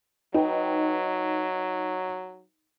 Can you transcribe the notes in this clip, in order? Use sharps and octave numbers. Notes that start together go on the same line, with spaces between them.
F#3 D#4 B4 G5